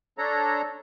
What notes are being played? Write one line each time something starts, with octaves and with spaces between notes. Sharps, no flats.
D4 A4 C#5 A#5